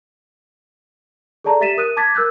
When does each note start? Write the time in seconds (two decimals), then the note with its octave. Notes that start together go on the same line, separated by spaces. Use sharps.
1.44 G#4 A4 D5 A5 A#5
1.61 G4 E5 A6 B6 D#7 E7
1.77 A#4 D#6 F#6 D#7
1.97 A5 D6 G#6 A6 B6
2.15 A#4 E6 F#6 G6